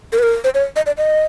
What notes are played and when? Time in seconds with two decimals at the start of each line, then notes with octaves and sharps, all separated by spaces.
0.12 A#4
0.19 B4
0.23 A#4
0.44 C5
0.54 C#5
0.76 D#5
0.86 D5
0.98 D#5